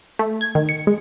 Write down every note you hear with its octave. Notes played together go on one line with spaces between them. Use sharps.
A3
G#6
D#3
C#7
G#3